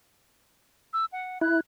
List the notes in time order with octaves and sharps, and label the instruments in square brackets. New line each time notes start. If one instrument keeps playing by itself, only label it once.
[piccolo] E6
F#5
[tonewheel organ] E4 [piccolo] F#6